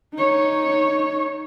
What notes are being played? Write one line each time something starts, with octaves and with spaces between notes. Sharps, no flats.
D#4 C#5